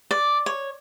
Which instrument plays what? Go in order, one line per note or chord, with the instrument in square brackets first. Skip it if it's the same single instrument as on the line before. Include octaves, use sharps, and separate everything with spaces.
[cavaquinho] D5
C#5